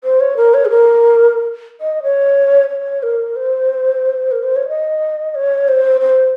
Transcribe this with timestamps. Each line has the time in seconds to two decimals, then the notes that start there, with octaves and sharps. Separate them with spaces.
0.04 C5
0.20 C#5
0.37 A#4
0.54 C#5
0.65 G#4
0.70 A#4
1.81 D#5
2.03 C#5
2.70 C#5
3.03 A#4
3.36 C5
4.31 A#4
4.43 C5
4.56 C#5
4.68 D#5
5.35 C#5
5.68 C5
6.01 C5